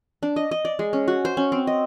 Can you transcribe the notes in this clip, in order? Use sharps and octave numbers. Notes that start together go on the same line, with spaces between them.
D4
D#5
D#5
D5
G#3
C#4
F#4
C5
C#4
C4
D#5